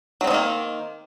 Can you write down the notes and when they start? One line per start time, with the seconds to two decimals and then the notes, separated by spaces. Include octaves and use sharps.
0.21 F#3
0.24 C4
0.27 F3
0.31 D#3
0.34 A#3